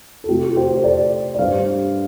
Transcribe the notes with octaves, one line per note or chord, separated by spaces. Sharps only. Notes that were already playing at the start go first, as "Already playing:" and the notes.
A4
C3 A3 F4 G4
A4
G4 C5
C5
A4 D5
D5
G2 G3 D4 C5 F5